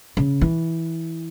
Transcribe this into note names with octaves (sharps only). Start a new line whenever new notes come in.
C#3
E3